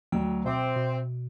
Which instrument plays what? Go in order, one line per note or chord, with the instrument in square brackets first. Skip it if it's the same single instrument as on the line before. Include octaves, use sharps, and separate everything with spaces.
[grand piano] D2 F#3 [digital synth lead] G5
[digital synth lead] B2 [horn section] C4 [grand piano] E5 D6
[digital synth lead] B2